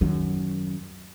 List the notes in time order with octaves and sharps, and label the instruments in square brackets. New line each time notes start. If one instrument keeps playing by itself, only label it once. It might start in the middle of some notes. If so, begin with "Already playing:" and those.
[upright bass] F#2 D#3